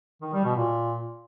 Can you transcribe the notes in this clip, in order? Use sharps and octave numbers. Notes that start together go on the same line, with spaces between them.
D#3
G3
B2
A#2